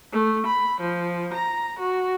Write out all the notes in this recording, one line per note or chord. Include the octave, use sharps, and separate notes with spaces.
A3
B5
F3
A#5
F#4